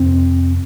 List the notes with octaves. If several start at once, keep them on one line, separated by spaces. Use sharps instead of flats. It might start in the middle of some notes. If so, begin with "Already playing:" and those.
Already playing: F2 C3 C4